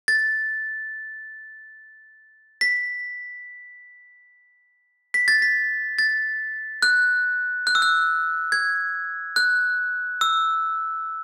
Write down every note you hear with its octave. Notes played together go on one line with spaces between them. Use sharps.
A6
B6
B6
A6
B6
A6
F#6
F#6
E6
F#6
G#6
F#6
E6